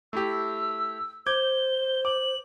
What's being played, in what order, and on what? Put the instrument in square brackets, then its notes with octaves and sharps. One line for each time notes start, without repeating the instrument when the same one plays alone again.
[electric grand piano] A3 E4 G4 [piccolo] E6
[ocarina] C5 [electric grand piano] D6 G6 G#6 [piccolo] G7
[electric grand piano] D6 [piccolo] F#7